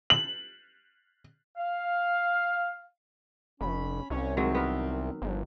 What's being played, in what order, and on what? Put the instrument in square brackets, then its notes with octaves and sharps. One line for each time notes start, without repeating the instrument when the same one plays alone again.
[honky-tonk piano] F#7
[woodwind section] F5
[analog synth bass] F1 [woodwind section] C#4 B5
[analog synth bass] C2 [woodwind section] C#4 C#5
[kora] D#3 F#3 G#3 [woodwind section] C4
[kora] B3 A#4
[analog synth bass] G1 [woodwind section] F3 F#3 D4